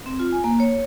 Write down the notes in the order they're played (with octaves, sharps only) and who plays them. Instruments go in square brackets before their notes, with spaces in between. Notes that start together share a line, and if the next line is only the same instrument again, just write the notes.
[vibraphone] C4
F4
G#5
A#3
C#5